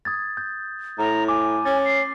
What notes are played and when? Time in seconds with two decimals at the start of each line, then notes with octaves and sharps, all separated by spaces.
0.05 D#6 G#6 A6
0.37 G6
0.98 A2 A#5
1.28 G#5 D6
1.65 C#4 A6
1.85 C7